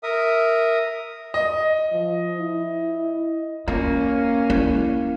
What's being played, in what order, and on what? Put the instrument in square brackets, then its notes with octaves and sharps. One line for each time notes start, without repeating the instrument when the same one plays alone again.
[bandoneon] A#4 E5 D#6
[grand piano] D#5
[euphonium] F3
E4
[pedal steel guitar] A#3 [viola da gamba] C#4 [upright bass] F4
[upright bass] E4